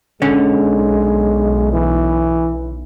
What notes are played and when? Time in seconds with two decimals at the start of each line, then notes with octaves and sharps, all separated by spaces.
0.22 B1 D3 G#3 C#4
1.73 E3